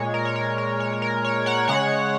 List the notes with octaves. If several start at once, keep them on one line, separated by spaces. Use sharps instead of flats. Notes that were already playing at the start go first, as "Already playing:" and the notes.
Already playing: A#2 G#3 C#5
A#4
C#5
A#4
A#4
C#5
C#5
A#4
C#5
C#5 F#5
C#3 G#3 C#5 F#5